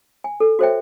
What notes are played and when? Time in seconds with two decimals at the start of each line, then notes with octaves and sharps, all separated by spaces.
0.24 G#5
0.40 A4
0.59 F#4 A4 C5 C#5 E5 G5